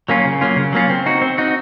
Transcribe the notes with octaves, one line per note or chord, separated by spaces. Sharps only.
F#3 A#3 C#4 F4
C#3
F#3 A#3 C#4 F4
C#3
F#3 A#3 C#4 F4
C4
D#4 F#4
C4
D#4 F#4